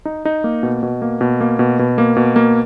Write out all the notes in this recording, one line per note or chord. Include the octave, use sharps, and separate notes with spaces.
D#4
D#4
A#3
B2
B2
A#3
B2
A#3
B2
B2
A#3
B2
A#3